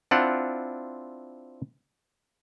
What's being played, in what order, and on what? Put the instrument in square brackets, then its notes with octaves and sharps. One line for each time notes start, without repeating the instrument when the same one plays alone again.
[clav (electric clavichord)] C4 D4 E4 F4 F#5